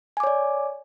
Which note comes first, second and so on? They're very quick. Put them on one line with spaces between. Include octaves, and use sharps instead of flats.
G#5 D6 C#5 D5